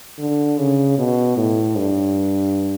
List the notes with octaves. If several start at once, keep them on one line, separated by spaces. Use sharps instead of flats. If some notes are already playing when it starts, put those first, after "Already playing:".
D3
C#3
B2
A2
G2